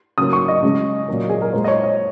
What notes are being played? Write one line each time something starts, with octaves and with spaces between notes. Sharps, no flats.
C#3 F#3 A#3 D#6
C#6
D#5
C#3 G#3
A#2 F#3 A#3
G#4
A#4
A#2 G#3 C5
D#5
C#5
D#5